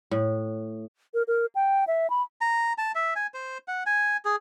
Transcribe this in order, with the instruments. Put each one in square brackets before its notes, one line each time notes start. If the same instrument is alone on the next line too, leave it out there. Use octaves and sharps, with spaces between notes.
[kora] A2
[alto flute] A#4
A#4
G5
E5
B5
[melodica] A#5
A5
E5
G#5
C5
F#5
G#5
G#4